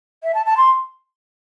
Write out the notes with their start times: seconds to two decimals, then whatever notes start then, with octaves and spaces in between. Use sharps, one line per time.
0.24 E5
0.34 A5
0.46 A5
0.57 C6